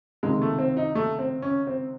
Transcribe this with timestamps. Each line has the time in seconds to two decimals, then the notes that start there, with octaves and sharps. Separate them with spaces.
0.23 C#2 C3 D#3 G#3
0.42 A3
0.59 C4
0.77 D#4
0.95 A3
1.19 C4
1.42 C#4
1.67 C4